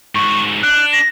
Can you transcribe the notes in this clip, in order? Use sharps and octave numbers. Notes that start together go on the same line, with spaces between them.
G#2 F#4 C#6
D4 F#6
A#6